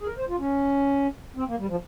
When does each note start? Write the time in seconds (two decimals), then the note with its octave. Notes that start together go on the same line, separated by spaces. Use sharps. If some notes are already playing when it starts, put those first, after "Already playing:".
0.01 G#4
0.07 A#4
0.17 C5
0.29 F4
0.39 C#4
1.37 C4
1.48 A#3
1.59 G3
1.69 F3